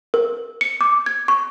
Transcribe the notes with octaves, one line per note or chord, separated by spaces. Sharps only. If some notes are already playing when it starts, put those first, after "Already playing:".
A#4
C#7
D6
G#6
C#6